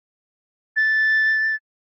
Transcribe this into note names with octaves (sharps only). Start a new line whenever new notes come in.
A6